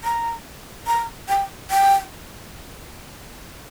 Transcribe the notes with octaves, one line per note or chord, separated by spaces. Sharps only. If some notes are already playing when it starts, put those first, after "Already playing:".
A#5
A#5
G5
G5